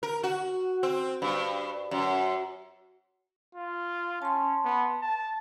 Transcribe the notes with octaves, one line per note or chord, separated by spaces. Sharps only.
A#4
F#4
C4
G2
F#2
F4
C#4 A5 C6
B3
A5